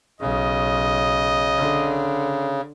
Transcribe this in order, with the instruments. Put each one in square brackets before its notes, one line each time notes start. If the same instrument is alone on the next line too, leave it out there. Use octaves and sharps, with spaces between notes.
[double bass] B1 [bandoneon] C#3 [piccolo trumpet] D#5
[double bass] D3